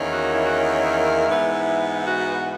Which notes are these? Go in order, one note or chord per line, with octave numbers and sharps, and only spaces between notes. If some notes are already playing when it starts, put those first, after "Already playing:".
Already playing: E2 D#3 A#3 C#4
F#4
E4
F#4
E4
G#2 E3 B3
E4
F#4